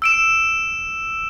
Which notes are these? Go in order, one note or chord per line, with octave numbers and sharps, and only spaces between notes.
E6 D7 E7